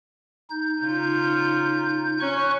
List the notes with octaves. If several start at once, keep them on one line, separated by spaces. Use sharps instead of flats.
D#4 G6
C#3 F4
C#4 C#5 C#6 F#6